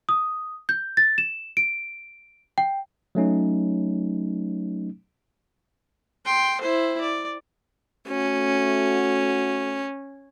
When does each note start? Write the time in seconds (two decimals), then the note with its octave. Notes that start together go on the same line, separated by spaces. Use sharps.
0.09 D#6
0.69 G6
0.97 A6
1.18 E7
1.57 D7
2.58 G5
3.15 F#3 A3 C#4 D#4
6.26 G5 C6
6.61 E4 C5
7.01 D5
8.08 A3 C#4 F#4